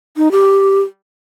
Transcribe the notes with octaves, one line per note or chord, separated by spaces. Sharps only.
D#4
G4